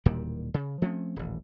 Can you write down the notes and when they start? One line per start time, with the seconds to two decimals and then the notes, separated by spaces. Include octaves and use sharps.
0.06 E1 D#2 A#2 G3
0.54 C#3
0.82 F3 A3 C4 C#4
1.16 D#1 A1